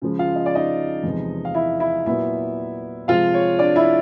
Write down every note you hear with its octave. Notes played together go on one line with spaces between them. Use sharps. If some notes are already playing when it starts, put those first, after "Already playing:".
C#3 F3 G#3
F4 F5
D#5
D5
D#4 D#5
E2 C3 F3 G#3
F5
E4 E5
E4 E5
A#2 F#3 B3 E4 E5
C3 F3 G#3 C4 F4 F5
C#5
D4 D5
E4 E5